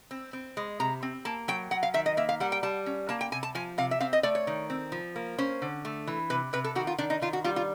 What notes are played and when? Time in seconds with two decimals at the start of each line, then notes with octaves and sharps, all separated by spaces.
0.11 C4
0.33 C4
0.57 G#3
0.80 C3 A#5
1.03 C4
1.25 A#3 A5
1.48 F#3 G5
1.71 F#3 F#5
1.83 F5
1.94 D#3 E5
2.06 D#5
2.17 A#3 E5
2.29 F5
2.40 G3 F#5
2.52 G5
2.63 G3 A5
2.86 C#4
3.09 A#3 A5
3.21 G5
3.32 C3 G#5
3.43 A5
3.55 F3 G#5
3.78 C3 F5
3.91 E5
4.00 C4 F5
4.13 D#5
4.23 A3 D5
4.35 C#5
4.47 D#3
4.70 C4
4.92 F3
5.16 A#3
5.38 C#4 C5
5.62 D3
5.85 A3
6.07 E3
6.30 C3 B4
6.53 C3 B4
6.64 A4
6.75 D#3 F#4
6.87 F4
6.98 D#3 D4
7.10 D#4
7.22 D#3 F4
7.33 F#4
7.44 G3 F4
7.56 F4